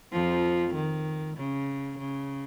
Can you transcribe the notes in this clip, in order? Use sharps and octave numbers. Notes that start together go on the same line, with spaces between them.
F2 F3
D#3
C#3
C#3